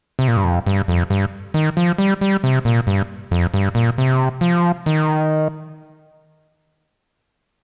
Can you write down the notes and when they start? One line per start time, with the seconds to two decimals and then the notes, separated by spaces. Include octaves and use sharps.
0.19 C3
0.28 A#2
0.37 G2
0.44 F2
0.66 G2
0.88 F2
1.10 G2
1.54 D#3
1.77 F3
1.98 G3
2.21 G3
2.44 C3
2.65 A#2
2.87 G2
3.31 F2
3.54 G2
3.75 A#2
3.98 C3
4.41 F3
4.86 D#3